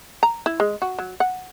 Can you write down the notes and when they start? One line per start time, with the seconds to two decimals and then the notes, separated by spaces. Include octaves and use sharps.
0.23 A#5
0.46 E4
0.60 G#3
0.82 F#4
0.99 F#3
1.20 F#5